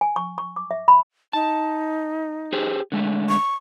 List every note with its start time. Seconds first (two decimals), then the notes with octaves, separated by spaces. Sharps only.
0.01 G#5
0.16 C#6
0.38 C#6
0.56 D6
0.71 E5
0.88 B5
1.33 D#4 A5
2.53 G4 G#4 C5
2.92 D3 G#3 A3
3.29 C#6